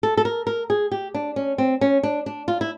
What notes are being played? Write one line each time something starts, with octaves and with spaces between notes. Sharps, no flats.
A4
A4
A#4
A#4
G#4
G4
D4
C#4
C4
C#4
D4
D4
F4
E4